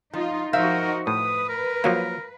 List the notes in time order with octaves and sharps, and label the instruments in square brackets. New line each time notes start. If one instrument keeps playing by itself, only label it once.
[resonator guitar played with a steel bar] F3 [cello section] D#4 F4
[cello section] F3 D#4 F#4 [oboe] A#4 [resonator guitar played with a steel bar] C5 E5 F5
[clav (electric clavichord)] A2 [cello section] B4 [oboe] D#6
[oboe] A#4
[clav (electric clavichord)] F3 F#3 A#3 [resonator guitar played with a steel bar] F5